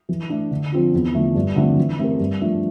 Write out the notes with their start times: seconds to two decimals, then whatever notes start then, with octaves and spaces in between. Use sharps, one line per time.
0.09 E3
0.29 A3 D4
0.51 D3
0.72 F3 C4 F4
0.94 E2
1.14 D3 F3 A3
1.35 G2
1.56 D3 F3 A3 C4
1.77 E3
1.99 A3 C4 G4 A#4
2.19 G2
2.41 F3 A3 D4